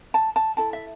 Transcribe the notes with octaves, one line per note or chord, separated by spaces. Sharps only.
A5
A5
E4 A4 A5
E5